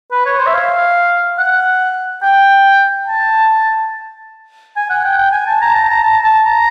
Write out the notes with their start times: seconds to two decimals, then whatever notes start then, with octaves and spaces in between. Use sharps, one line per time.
0.12 B4
0.26 C#5
0.39 C5
0.46 E5
0.54 F5
1.39 F#5
2.23 G5
3.07 A5
4.76 G#5
4.90 F#5
5.04 G5
5.18 G5
5.32 G#5
5.47 A5
5.61 A#5
5.75 A5
5.89 A#5
6.03 A5
6.24 A5
6.45 A#5